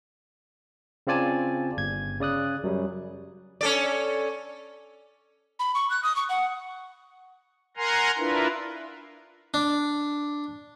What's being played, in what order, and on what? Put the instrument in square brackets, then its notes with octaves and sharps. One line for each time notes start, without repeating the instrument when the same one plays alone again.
[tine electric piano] C#3 C4 F4 D5 G#5 A5
G1 G#6
C#3 D5 D#6 F#6
F#2 F#3 G3
[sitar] C#4 A4 D5
[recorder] B5
C#6
F#6
D#6
C#6
F#5
[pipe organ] A#4 F#5 G#5 A#5 C6
D4 E4 F4 A#4 B4
[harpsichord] D4